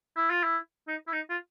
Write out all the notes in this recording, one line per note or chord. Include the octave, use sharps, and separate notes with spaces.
E4
F4
E4
D#4
E4
D#4
F4